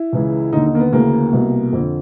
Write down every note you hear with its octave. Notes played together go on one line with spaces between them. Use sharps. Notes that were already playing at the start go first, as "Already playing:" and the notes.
Already playing: E4
C#2 C#3 E3
D#2 D3 D#4
D#4
A#3
B3
D2 C#3 E3 A#3
C2 B2
F2 D3